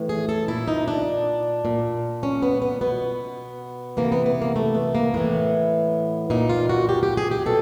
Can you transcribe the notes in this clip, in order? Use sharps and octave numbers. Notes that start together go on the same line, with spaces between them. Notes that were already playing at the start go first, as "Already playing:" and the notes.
Already playing: A2 E3
G#4
A4
A#2 E4
D#4
D4
A#2
C#4
B3
B3
B2 B3
C3 E3 A#3
B3
B3
A#3
A3
B3
A#3
A2 E3 B3
A#2 D#4
F4
F#4
G4
G4
G#4
G4
B2 A4